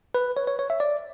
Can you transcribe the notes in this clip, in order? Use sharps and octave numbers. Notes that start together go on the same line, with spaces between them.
B4
C#5
C#5
C#5
E5
D5